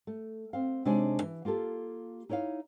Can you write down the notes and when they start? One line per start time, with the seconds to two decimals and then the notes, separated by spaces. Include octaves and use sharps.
0.07 A3
0.53 C4 F5
0.85 C3 G#3 D4 D#4 C#5 G#5
1.22 E3
1.45 A#3 F4 G4 A4
2.29 D#4 E4 C#5 D5 F5